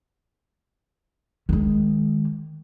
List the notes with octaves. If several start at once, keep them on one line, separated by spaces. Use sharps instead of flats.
D#3 G#3